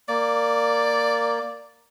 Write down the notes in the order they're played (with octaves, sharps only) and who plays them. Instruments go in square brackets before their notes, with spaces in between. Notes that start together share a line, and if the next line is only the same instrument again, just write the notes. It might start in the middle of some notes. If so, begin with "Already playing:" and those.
[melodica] A#3 [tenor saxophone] D5